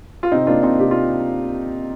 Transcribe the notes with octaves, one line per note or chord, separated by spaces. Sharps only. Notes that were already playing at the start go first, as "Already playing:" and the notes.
F4
C3 C4 D#4
A#3 D4 F4
C3 C4 D#4
C3 G4
A#3 F4